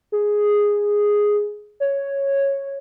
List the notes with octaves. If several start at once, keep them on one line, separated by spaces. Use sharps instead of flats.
G#4
C#5